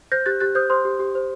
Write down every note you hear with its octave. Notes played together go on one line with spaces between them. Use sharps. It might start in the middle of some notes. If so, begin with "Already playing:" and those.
C5 G6 A#6
G4 F#6 A6
G4 F#6 A6
C5 D#6 G6
C5 C6 D#6
G4
G4
C5